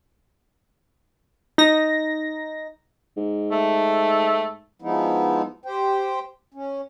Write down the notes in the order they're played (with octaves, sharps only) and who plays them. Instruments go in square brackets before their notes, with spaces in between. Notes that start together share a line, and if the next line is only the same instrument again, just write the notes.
[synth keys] D#4 A#6
[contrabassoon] G#2
[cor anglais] A3
[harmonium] F3 G#3 B3 D#4 E4
G4 C5 G5
C#4